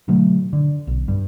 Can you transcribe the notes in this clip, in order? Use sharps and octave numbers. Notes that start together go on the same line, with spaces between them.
B2 D3 F#3 A3
D3
B1
G2